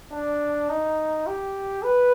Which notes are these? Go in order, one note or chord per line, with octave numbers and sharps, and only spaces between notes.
D4
D#4
G4
B4